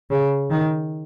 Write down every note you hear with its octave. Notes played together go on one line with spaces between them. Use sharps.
C#3
D#3